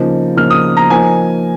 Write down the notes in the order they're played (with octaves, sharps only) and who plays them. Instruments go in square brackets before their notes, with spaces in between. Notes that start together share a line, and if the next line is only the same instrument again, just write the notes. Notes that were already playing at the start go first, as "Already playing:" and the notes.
Already playing: [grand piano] C#3 F3 A#3 D#4
C#3 F3 A#3 D#4 F6
D#6
A#5
F3 A#3 D#4 G#5